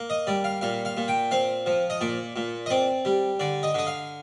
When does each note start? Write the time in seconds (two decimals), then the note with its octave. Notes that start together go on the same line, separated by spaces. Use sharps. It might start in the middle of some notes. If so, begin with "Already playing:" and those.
Already playing: A#3
0.10 D#5
0.27 G3 D5
0.44 F5
0.61 A#2 F5
0.85 F5
0.97 A#2
1.08 G5
1.31 C4 F5
1.66 F3
1.90 D#5
2.01 A#2 D5
2.36 A#2
2.66 D#5
2.70 C4 D5
3.05 G3
3.40 D3 D5
3.63 D#5
3.74 D3 D#5
3.87 F5